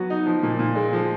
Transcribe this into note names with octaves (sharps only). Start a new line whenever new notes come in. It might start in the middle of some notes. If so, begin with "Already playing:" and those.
Already playing: F#3 B3 F#4
D#4
F3
A#2
A#2
G#3
F3